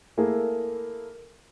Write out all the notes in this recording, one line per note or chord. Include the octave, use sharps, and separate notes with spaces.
A3 A#3 E4 G#4 A#4